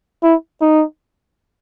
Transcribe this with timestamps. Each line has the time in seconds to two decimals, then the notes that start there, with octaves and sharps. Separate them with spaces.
0.23 E4
0.61 D#4